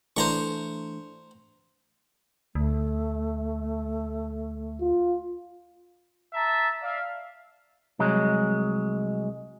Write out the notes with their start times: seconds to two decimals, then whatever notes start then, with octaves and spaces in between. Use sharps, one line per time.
0.17 E3 A3 D4 C5 A#5 C#6
2.55 D2 A3
4.81 F4
6.34 E5 A5 A#5
6.82 D5 E5 F5
7.99 C2 F#3 G#3